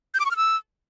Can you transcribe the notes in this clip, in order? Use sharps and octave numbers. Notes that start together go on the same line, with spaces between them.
G6
D6
C#6
F6
E6